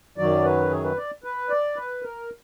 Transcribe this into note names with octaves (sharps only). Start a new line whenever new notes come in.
F#2 D#3 F#3 D5
B4
G#4
B4
D5
B4
D5
B4
A#4